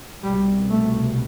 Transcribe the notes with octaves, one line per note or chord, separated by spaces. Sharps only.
C2 B2 G3
A3